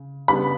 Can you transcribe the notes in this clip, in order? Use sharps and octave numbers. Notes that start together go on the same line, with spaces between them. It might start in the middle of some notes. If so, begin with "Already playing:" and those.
Already playing: C#3
C#3 G3 B3 D4 B5